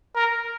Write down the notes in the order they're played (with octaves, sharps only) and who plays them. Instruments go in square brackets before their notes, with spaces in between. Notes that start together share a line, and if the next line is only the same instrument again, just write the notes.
[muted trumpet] A#4